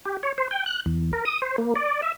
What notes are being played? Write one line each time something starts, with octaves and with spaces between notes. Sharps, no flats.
G4
C#5
C5
G5
F#6
E2
A#4
D#6
C5
A#3
D5
E5